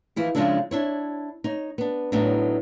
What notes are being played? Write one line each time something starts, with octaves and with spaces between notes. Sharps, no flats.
E3 F3 E4 G#4
C#3 F3 G#3 D4 E4 A4
D4 E4 C#5
D#4 C#5
B3 D4
A2 F#3 B3 D4 D#4